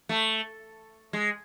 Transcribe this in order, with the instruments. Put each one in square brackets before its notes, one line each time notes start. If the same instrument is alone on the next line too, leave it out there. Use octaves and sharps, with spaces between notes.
[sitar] A3
G#3